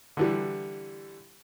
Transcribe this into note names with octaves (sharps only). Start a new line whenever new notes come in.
D3 E3 G3